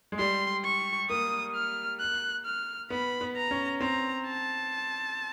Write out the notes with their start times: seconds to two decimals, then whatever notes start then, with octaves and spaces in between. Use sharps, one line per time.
0.12 G#3
0.19 G3 C6
0.65 C#6
1.10 A#3 D#6
1.55 F6
2.00 F#6
2.46 F6
2.90 B3 B5
3.21 B3
3.36 A#5
3.51 C#4
3.81 C4 A#5
4.27 A5